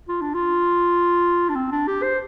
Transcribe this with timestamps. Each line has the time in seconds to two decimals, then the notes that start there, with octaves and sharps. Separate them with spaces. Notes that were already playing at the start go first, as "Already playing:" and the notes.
0.08 F4
0.21 D4
0.34 F4
1.49 D4
1.55 C4
1.72 D4
1.87 G4
2.02 C5